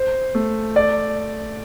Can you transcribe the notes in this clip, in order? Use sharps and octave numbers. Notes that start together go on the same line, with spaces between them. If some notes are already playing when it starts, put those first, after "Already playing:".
Already playing: C5
A3
D5